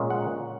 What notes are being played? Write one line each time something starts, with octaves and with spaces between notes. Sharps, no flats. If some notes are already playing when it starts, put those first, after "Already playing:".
Already playing: A#2 G#3 C#4
F#5